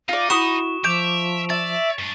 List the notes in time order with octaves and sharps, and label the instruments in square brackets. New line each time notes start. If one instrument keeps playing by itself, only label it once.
[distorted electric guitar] D#4 [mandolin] F4 D5
[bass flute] E4 [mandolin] F#4 B5 D#6 [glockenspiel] C#6 E7
[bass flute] F3 [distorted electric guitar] E5 [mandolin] D6 G6 [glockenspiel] D7 F7
[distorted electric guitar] D5 [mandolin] E5 [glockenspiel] A6
[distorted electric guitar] F#2 D4